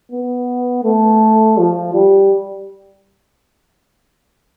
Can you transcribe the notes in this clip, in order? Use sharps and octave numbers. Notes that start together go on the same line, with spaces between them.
B3
A3
F3
G3